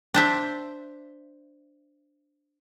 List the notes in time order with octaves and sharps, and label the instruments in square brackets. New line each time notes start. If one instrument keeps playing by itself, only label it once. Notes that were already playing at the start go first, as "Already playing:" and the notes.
[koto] D4 C5 E5